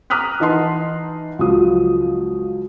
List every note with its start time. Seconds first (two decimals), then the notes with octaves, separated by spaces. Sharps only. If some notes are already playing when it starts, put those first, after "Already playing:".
0.10 A#5 D6 D#6 F6 F#6 B6
0.40 E3 D#4 F#5 A5 C6 C7
1.39 C#2 F3 F#3 D#6